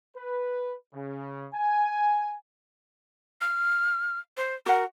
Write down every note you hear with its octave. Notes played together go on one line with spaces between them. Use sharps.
B4
C#3
G#5
F6
C5
F#4 A#4 F#5